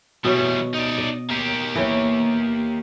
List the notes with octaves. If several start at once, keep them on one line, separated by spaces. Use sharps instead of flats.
B2 E3 G3 C#5
D#4 D5
D#5
A#3 G4
E3 C#5 G5